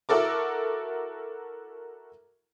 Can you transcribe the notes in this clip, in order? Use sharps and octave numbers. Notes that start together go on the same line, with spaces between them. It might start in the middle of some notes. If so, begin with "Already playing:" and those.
E4 F#4 A4 A#4 D6